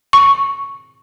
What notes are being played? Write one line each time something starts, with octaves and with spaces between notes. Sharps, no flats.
C#6